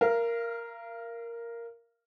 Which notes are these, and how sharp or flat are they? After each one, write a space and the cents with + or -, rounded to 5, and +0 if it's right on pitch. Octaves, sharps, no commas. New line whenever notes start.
A#4 +0 F5 -35